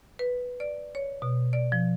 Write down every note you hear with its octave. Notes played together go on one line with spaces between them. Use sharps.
B4
D5
C#5
B2
D5
F3